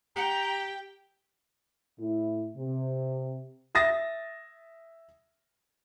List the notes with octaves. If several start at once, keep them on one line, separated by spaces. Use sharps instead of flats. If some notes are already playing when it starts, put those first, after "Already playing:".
G4 G5 A#5
A2 E4
C3
E5 D#6 A6 A#6